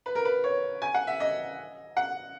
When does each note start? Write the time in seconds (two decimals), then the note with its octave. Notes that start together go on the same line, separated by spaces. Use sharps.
0.06 B4
0.15 A#4
0.25 B4
0.44 C#5
0.82 G#5
0.94 F#5
1.07 E5
1.20 D#5
1.97 F#5